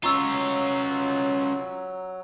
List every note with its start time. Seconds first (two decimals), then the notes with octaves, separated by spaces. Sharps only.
0.04 F#3 C#4 F4 A#5 C#6 E6